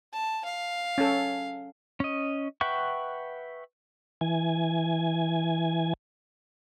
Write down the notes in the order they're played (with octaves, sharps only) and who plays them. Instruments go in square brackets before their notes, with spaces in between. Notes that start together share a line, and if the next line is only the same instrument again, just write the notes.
[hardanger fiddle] A5
F5
[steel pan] C#4 A4
[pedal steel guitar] C#4 D#5
B4 E5 F#5 G5 C#6
[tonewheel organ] E3 G#5